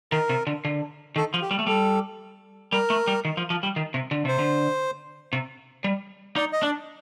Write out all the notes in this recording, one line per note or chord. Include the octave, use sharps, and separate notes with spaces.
D#3 A#4
C3
D3
D3
D#3 A4
F3
G4
G3
A3
G3 A4
G3 A#4
A3
G3
D#3
F3
F3
G3
D#3
C3
D3
C3 C5
D3
C3
G3
D#4 D5
D#5
D4 D5